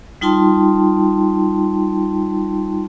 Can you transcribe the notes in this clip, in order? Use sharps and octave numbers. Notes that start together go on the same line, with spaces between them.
G3 D#4 F4 G5 A5 C6